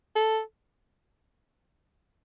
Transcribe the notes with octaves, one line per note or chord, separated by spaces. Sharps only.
A4